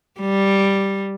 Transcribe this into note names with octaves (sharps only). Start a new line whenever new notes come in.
G3